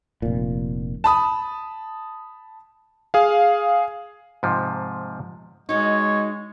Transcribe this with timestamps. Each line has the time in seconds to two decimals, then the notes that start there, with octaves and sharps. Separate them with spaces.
0.22 F1 A#2
1.04 A5 B5 D#6
3.14 G#4 F5
4.43 G#2 C3 F3
5.69 G#3 D#4 F#4 C#5